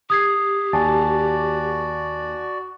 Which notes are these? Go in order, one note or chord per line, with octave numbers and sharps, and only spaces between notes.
G4 D#6 G#6 C7
D#2 F#4 D5 G#5 A5 A6